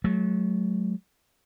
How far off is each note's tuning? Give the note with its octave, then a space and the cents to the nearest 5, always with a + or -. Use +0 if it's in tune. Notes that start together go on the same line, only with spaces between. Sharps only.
F#3 +0 A3 -45